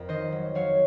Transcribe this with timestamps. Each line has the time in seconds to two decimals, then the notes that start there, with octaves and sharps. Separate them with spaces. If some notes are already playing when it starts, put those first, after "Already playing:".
Already playing: F2 A#4
0.09 D#3 C5 D#5
0.32 F#3
0.55 F#3 C#5 F5